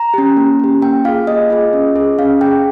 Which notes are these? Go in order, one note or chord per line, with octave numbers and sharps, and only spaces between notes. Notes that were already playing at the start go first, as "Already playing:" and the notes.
Already playing: A#5
C#4 G4
A#3
C#4 G4
A#3 G5
F4 G#4 F5
A#3 D#5
F4 G#4
C#4
G#4
C#4 F5
G#4 G5